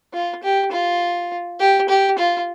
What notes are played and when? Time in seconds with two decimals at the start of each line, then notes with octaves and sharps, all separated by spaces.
0.13 F4
0.43 G4
0.72 F4
1.60 G4
1.89 G4
2.19 F4